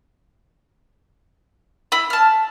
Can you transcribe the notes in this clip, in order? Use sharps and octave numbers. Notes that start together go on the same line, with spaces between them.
E4 B5
A5 F6